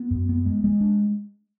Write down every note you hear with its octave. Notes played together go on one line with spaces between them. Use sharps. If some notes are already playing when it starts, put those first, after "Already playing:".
Already playing: B3
F#2
B3
G#3
G#3
D4